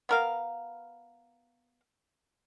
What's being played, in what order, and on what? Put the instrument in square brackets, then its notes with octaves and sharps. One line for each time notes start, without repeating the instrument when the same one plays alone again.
[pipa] B3 A#4 F5